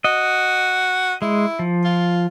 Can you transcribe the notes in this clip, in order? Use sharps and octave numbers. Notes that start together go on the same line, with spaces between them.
F#4 D#5
G#3 E4
F3
F4